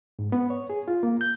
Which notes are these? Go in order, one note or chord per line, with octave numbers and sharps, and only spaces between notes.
G#2
B3
C#5
G#4
F4
A#3
G6